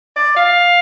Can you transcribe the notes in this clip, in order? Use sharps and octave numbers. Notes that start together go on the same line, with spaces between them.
D5
F5